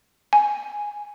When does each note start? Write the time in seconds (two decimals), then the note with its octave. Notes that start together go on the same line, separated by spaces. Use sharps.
0.33 G#5